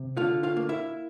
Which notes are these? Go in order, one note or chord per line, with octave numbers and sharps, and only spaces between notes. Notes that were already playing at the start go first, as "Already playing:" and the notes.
Already playing: C3
D3 F4 F5
F4 F5
A#3
E4 E5